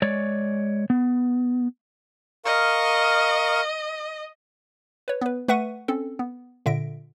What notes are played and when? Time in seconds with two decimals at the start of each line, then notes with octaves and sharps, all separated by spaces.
0.02 G#3 C#5 D5
0.90 B3
2.45 A#4 D#5 F5 C#6
5.08 B4 C#5
5.21 B3 B4
5.48 A3 B4 E5 F#5 C#6 D#7
5.88 C4 C#4 A4
6.19 B3
6.66 A#2 D3 E5 A#6 D7